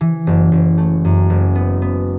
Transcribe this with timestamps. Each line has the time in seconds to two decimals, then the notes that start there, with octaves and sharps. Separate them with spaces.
0.01 E3
0.27 F#1
0.52 F#1
0.78 A3
1.05 F#2
1.30 F#1
1.55 B3
1.82 B3